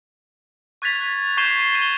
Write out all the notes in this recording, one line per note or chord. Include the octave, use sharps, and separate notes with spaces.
C#6 F#6 G#6 A6 B6 F7
C#6 G6 G#6 C7 E7 G7
D#7 G7